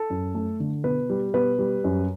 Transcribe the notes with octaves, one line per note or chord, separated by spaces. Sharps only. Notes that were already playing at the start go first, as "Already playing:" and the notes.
Already playing: A4
F#2
A3
D3
B2 B4
G3
B2 B4
G3
F#2